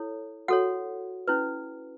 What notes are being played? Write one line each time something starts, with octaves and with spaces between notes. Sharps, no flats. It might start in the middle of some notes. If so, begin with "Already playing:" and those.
Already playing: E4 A4 C#5
F#4 A4 C#5 F#5
C#4 E4 B4